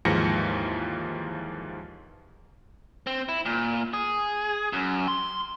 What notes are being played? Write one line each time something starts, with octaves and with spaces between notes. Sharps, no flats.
D#2 G#2 E3 F3 A#6 C#7
C4
E4
A#2
G#4
F#2
C6